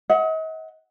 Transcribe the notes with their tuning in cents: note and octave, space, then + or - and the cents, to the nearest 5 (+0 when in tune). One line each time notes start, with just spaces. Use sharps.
D#5 +40 F#5 +0